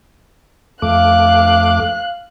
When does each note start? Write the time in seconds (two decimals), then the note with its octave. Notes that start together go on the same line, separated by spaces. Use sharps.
0.82 F2 A3 F5 D6 F#6